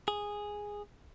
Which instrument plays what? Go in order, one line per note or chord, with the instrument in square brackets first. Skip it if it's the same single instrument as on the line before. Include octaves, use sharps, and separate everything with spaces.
[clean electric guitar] G#4